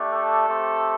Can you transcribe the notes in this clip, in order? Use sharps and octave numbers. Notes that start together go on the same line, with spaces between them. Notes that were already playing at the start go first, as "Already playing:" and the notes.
Already playing: A3 D4 G4
A4
A3 C4 G4